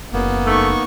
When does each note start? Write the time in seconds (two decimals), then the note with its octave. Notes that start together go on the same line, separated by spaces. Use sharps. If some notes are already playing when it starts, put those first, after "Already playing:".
0.13 F#1 A#3 B3
0.46 A3 D#4 C#6